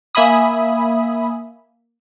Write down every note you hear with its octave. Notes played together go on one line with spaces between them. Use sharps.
A#3 E5 G#5 B5 D#6